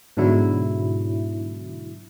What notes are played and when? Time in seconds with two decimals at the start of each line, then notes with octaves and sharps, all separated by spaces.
0.17 G#2 B2 D3 F#3 E4